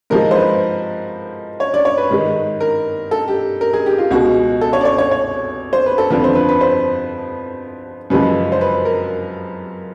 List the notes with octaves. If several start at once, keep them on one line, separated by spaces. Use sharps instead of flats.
G#2 F3 G#3 A#4
C5
B4
C#5
D5
C#5
B4
G#2 D#3 G#3
A#4
A4
G4
A#4
G#4
G4
F4
C#2 B2 G#3 F#4
A4
C#5
D5
C#5
C#5
C#5
C5
B4
A4
F2 D3 F3 B4
C5
B4
B4
C5
F#2 C#3 F3 G#3 B4
C5
B4
A#4